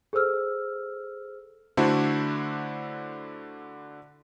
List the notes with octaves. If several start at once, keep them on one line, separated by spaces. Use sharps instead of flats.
G#4 A4 C5 E6 F6
D3 A3 D4 E4 F#4 C5